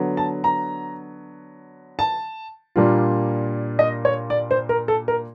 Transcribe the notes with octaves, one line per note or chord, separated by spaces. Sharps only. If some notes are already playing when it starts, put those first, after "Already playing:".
Already playing: D3 F#3 B3
A5
A#5
A5
A#2 G3 A#3 D4 F4
D#5
C#5
D5
C5
A#4
A4
A#4